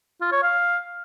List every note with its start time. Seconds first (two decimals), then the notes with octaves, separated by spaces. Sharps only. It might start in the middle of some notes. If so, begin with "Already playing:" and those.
0.21 F4
0.32 C#5
0.43 F5